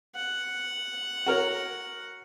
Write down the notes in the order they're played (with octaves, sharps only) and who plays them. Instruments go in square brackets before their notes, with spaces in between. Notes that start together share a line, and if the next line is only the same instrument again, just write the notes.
[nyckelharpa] F#5
[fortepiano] F#4 A#4 C#5